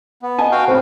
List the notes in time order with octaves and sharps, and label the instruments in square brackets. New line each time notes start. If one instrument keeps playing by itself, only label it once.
[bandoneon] B3
[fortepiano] D#5 G#5 A5
[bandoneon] F#4 F5 G5
[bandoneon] A2 C#3 [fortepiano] C4